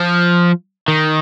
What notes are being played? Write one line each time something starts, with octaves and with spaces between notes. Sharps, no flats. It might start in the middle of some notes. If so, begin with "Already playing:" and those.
Already playing: F3
D#3